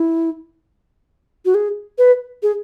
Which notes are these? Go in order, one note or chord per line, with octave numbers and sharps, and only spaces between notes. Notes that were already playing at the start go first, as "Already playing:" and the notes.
Already playing: E4
F#4
G#4
B4
G#4